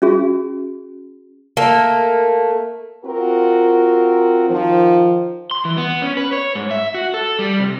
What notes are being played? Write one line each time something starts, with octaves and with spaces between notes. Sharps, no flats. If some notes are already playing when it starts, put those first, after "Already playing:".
C#4 F#4 G#4
A3 A#3
C4 F4 F#4 A#4
D#3 F3
C6
E3
B3
C#4
B4
C#5
G#2
E5
F#4
A4
G3
C3